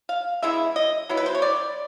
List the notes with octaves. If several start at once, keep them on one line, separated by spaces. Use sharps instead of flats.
F5
E3 G#3 B3 E4 E5
D#5
F#3 B3 E4
B4
C5
C#5
D5